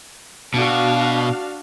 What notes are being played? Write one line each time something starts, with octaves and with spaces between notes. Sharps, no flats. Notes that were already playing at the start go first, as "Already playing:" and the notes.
B2 D4 F#4 F5